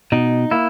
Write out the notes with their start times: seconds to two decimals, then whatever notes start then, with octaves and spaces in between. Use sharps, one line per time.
0.12 B2 D#4
0.51 A#3 E4